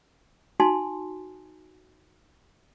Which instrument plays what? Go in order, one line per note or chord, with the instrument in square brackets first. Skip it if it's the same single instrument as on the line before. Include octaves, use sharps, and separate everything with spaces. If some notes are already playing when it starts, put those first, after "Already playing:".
[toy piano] D#4 F#4 G#5 A5 C6